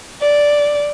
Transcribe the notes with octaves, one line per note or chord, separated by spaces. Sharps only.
D5